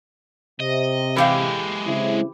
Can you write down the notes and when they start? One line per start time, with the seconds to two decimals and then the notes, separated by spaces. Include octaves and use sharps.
0.60 C3 D#5
1.16 E3 G#3 G4 A4 F5
1.87 C#3 C4 E4